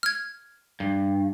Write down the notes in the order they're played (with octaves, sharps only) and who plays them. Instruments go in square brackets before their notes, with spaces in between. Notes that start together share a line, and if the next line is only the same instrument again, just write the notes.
[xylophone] F6 G#6
[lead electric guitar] G2